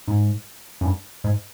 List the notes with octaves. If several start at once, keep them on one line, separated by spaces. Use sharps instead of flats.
G#2
F#2
G2
G#2